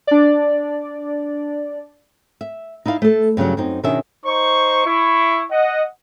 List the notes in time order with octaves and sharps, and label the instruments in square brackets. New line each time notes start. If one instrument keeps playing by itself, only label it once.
[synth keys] D4 D5
[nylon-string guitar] E5
D#4 E4 D5 F5
A3 A4
G2 C#3 E3 F#3
F#2 C4 D#4
B2 D#3 C#4 D4 G#4 E5
[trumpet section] D#4 C5 C#6
E4 C#6
D#5 F#5